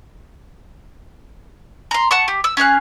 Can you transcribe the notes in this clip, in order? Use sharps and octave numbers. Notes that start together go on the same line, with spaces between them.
A#5 C6
F#5 A5 C#6
G4
E6
C#4 G#4 F5 F#6